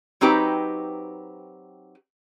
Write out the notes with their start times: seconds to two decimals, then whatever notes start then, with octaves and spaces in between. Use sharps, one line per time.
0.21 F#3 C4 D#4 G4 B4